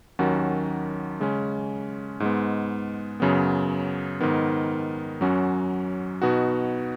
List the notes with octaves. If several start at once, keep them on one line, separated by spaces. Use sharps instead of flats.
D#2 D#3 F#3 C#4 F#4
C#3 G#3 C#4
G#2 G#3 B3
F#2 C#3 F#3 B3
G#2 D#3 B3
F#2 F#3 C#4 F#4
B2 B3 D#4 F#4